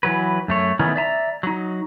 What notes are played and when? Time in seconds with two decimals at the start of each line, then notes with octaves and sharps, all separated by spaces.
0.03 E3 F#3 B4
0.48 F#2 A3 C#5
0.79 D#3 E3 A3 B3 C#4 D#4
0.96 D5 E5 A5 A#5
1.43 F#3 D#4